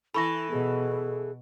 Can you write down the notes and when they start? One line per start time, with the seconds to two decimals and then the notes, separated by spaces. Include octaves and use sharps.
0.14 E3 E4 A4 B5 C#6 A#6
0.51 B2 G#4